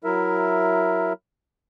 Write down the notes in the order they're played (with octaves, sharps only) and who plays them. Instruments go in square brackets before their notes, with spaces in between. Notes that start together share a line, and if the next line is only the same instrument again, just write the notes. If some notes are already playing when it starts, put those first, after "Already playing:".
[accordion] F#3 E4 A#4 E5